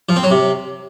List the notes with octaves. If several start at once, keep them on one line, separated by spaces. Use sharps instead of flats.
F3
C4
F#3
C3